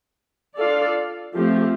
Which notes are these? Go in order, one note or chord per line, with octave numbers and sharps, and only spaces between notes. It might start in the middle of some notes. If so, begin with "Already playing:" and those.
D4 F4 A4 D5 F5
F3 A3 C4 G4